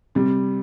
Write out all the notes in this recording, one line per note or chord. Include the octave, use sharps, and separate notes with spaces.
C3 G3